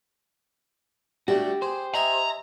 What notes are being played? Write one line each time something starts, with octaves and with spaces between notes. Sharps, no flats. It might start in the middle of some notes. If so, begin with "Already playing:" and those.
G3 A3 D4 F#4 G4
G#4 C5
D#5 E5 G#5 A#5